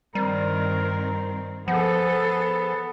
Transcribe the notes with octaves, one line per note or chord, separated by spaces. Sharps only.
G2 D#3 G3 C4 A#4
F3 B3 G#4 A4 F#5